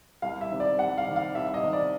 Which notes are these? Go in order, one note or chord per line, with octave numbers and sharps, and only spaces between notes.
C2 F5
E5
C3 D#3
D5
C2 F#5
F5
C3 D#3
F5
C2 E5
D#5
C3 D#3
D5